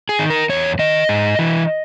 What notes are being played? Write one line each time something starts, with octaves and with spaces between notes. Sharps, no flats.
G#4
D#3
A#4
E2 C#5
D#3 D#5
G#2
E3